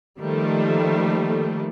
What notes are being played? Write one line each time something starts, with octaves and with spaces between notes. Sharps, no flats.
D#3 F3 G3 A3 A#3